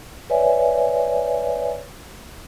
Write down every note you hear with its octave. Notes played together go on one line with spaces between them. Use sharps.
B4 C#5 D5 E5 G#5